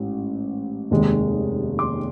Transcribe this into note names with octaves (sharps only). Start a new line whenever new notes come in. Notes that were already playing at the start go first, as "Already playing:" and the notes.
Already playing: A1 G#2
F1 D#2 D#3 G#3
C6 D6